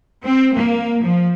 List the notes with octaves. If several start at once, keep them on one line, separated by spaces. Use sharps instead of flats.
C4
A#3
F3